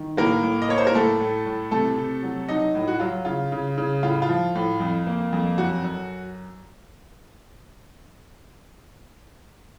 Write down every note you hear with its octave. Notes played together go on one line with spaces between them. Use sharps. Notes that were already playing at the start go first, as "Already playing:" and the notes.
Already playing: D#3
A2 A#3 A#4
A2
D#5
A#3 C#5
C5
A#4
A2 A3 A4
A2
A2
C3 A3 A4
C3
F#3
F#3 D#4 D#5
A2
F#4
F#3 F4
C#3 F4
C#3
C#3
A2 F4
F4
F3
A2
F2
A#3
F2
F#2 F#4
F#2